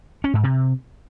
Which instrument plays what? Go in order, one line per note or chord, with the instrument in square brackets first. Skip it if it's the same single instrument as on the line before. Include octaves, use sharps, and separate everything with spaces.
[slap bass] C#4
G#2
C3